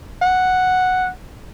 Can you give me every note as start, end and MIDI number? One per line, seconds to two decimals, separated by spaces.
0.22 1.08 78